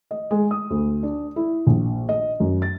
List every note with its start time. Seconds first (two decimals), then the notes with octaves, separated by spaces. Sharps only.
0.11 D#5
0.31 G#3
0.51 D#6
0.70 D2
1.03 D4
1.36 E4
1.67 A#1
2.09 D#5
2.40 F#2
2.62 A6